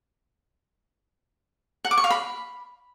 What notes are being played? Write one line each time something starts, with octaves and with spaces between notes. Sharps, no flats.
F#5
D6
C#6
F5
B5